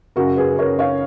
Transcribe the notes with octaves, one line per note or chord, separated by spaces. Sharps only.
F#2 C#3 F#4 A#4
G#4 B4
A#4 C#5
C#5 F5